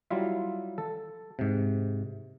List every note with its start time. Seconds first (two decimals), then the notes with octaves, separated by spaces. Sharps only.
0.11 F#3 G3 E4 F4 E5
0.78 A4
1.39 G#2 C3